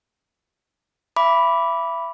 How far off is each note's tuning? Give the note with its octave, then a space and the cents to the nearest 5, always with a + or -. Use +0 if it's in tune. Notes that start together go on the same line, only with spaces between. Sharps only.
E5 +30 B5 +0 D6 -15